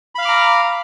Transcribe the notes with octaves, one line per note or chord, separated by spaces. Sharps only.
F5 A#5 B5 D6 F6